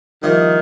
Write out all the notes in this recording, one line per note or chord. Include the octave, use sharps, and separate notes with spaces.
C2 C3 D#3 F3 A#3 D#4